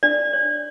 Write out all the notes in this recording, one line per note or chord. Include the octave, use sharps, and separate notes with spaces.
D4 D5
C#5